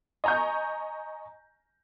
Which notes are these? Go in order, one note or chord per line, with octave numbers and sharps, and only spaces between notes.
D#5 G#5 A#5 C#6 G6